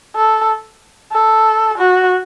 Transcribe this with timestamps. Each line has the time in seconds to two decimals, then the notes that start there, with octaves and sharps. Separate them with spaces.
0.16 A4
1.12 A4
1.78 F#4